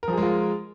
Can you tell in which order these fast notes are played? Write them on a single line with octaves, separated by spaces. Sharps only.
A#4 F3 G#4 G#3 F4